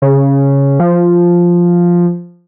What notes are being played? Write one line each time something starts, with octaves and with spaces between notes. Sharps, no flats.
C#3
F3